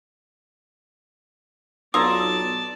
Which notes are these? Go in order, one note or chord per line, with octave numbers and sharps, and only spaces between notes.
B1 F4 D5 A5 A#5 D#6 E6 G#6